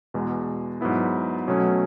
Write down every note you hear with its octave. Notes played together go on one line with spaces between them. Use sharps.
E2 B2 G#3
G#2 F#3 B3 E4
B2 F#3 A3 C#4